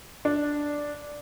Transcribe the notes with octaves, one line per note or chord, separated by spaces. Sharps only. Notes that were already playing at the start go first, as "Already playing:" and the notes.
D4